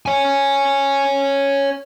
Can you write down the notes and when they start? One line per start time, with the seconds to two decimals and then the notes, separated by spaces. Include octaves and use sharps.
0.06 C#5 G#5